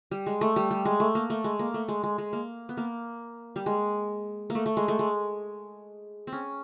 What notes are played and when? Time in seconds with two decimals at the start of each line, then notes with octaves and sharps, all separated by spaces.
0.11 G3
0.26 G#3
0.41 A3
0.56 G3
0.71 G3
0.85 G#3
1.00 A3
1.15 A#3
1.30 A3
1.44 G#3
1.59 A#3
1.74 A3
1.88 G#3
2.03 G#3
2.18 G#3
2.33 A#3
2.69 B3
2.77 A#3
3.56 G3
3.66 G#3
4.50 A#3
4.55 A3
4.66 A3
4.77 G#3
4.88 A3
4.99 G#3
6.27 C4
6.32 C#4